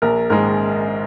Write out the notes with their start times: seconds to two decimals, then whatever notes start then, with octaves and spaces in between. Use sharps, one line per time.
0.02 A#1 A#4
0.30 G#2 D#3 G#3 A#4